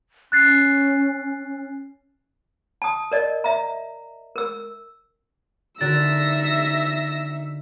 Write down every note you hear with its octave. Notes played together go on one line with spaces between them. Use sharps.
C#4 F#6 A6 C7
A5 D#6
A#4 D5 D#5
E5 A#5
A#4 E6
D3 D#4 F#4 A#4 E5 E6 A6 A#6